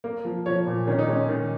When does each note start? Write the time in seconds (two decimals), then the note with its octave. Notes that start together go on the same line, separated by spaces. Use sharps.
0.04 A#3
0.25 F3
0.46 F3 C#5
0.67 A#2
0.87 D#3 C#4
0.99 D#4
1.08 G#3 C#4
1.28 D#3